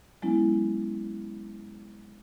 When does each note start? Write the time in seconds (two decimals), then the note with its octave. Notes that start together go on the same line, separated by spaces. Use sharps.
0.22 F#3 G#3 B3 C#4 E4